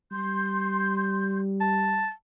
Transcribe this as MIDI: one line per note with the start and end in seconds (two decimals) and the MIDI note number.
0.11 2.06 55
0.11 1.37 84
0.11 1.37 91
1.61 2.11 81